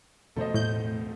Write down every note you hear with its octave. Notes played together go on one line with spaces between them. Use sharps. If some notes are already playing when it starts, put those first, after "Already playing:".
E2 B2 A3 A4 C5 D#5
A2 G6